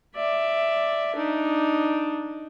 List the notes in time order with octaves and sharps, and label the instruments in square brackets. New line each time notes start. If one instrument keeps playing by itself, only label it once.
[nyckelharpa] D5 E5
D4 D#4